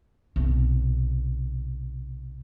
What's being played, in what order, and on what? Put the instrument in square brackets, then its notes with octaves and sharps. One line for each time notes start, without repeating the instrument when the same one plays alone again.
[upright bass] B1 C3